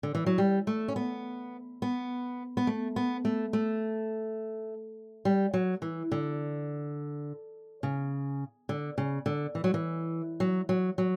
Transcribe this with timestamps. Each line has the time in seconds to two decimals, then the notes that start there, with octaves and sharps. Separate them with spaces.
0.03 D3
0.15 E3
0.26 F#3
0.38 G3
0.67 A3
0.88 C#4
0.96 B3
1.82 B3
2.57 B3
2.67 A3
2.96 B3
3.25 A3
3.53 A3
5.25 G3
5.54 F#3
5.82 E3
6.12 D3
7.83 C#3
8.69 D3
8.98 C#3
9.26 D3
9.55 E3
9.64 F#3
9.74 E3
10.40 F#3
10.69 F#3
10.98 F#3